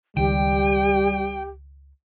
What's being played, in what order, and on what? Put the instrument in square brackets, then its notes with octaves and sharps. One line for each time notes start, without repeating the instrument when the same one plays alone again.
[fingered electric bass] C#2 D#3 [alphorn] G3 [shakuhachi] G4 [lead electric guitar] G5